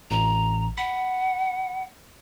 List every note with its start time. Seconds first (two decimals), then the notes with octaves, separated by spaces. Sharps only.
0.11 A1 A#5
0.78 F#5 B5